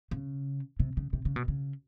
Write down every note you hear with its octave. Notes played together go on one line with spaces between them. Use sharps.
C#3
C3
C#3
C3
C#3
B2
C#3